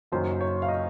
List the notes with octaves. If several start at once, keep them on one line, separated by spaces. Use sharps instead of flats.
F#1 F#2 D#3 F#3 C5
C#5
F5
D#5